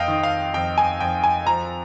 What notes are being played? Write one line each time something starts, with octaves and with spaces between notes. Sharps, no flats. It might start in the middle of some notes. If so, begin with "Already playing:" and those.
Already playing: F2 D#5 F5 G5
D#3
F5
F2 G5
G#5
F2 G5
G#5
F3 A#5